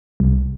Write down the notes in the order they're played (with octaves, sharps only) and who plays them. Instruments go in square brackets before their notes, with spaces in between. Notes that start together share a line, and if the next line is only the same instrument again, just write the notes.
[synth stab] C2